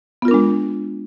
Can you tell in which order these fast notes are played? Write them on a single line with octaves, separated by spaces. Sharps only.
B3 F4 A#4 D4 G#3